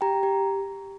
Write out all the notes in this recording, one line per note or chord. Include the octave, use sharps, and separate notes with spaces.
G4 G5 A#5
G4